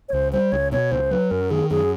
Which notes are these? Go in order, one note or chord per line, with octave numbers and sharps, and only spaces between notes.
C#5
C#2 C5
G3 C5
C#2 C#5
B2 C#5
C#2 C5
F#3 B4
F#2 A#4
D#3 G#4
F#2 G#4